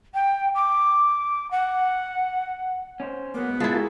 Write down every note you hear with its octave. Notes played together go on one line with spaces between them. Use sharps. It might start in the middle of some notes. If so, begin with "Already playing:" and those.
G5
D6
F#5
C#4 D4 C5
F#3 A#3 B3
G#2
G#3 E4 F4 A5
F#4 G4 A#4